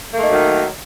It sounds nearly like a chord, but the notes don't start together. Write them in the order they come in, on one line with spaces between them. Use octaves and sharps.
A#3 A3 D#4 F#3 D#3